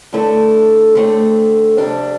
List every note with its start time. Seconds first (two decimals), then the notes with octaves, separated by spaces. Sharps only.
0.13 G2 D3 A3 E4
0.95 D3 A3 C4
1.77 F2 C3 G3 D4